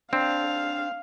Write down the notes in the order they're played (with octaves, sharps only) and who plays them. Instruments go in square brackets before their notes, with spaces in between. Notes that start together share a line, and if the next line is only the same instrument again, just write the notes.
[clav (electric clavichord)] C4 [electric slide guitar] D4 [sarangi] F5